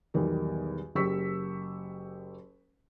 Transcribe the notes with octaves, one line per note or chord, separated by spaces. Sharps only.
B1 E2 D#3 G3
F#1 G4 C#6 E6 B6